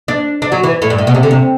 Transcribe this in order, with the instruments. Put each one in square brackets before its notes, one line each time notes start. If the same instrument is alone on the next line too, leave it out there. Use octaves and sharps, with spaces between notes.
[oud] D4
D4
F#3
E3
A2
G2
A2
B2
C3
D3
C3